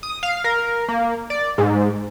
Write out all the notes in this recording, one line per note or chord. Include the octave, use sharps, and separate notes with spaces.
D#6
F5
A#4
A#3
D5
G#2